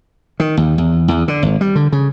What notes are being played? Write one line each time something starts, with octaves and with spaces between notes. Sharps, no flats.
D#3
D#2
E2
E2
D3
G#1
G3
D3
C#3